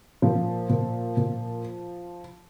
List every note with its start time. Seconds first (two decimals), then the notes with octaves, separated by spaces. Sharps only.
0.22 A#2 F3
0.69 A#2
1.17 A#2